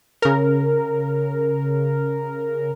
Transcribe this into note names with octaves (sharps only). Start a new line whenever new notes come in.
C#3 A#4